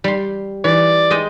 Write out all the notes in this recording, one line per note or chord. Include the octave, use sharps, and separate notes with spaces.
G3 C6
E3 D5
G#3 D#5 G5